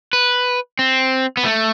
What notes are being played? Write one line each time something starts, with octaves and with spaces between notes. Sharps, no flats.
B4
C4
B3
A3